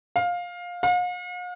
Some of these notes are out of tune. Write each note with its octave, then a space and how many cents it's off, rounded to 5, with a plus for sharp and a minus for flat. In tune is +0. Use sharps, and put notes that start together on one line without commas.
F5 +15
F5 +45